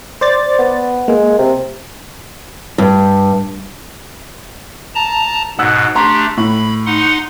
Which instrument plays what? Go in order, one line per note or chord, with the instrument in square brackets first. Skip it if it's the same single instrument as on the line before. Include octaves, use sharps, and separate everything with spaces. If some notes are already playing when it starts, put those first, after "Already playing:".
[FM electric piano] C5 D5 A6
[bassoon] B3
[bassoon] G#3 [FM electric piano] A#3
[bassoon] C3
[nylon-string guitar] G2
[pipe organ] A5 A#5
[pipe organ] G#2 B2 [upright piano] F#5 E6 F#6
[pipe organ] A3 D4 G4 [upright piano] A#5 C6
[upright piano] A2 [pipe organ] B5
[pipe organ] D#4 F#5 C6